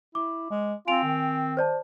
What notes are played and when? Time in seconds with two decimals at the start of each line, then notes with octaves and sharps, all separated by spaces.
0.15 E4 D6
0.50 G#3
0.87 C4 F4 G#5 D7 F7
1.04 D#3
1.57 C5 D5 A5